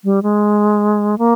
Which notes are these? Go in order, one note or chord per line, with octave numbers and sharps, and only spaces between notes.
G3
G#3
A#3